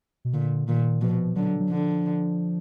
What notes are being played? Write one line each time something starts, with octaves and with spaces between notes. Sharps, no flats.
B2
A#2 D3
A#2 D#3
B2 F3
D3 F#3
F#3
D3 F3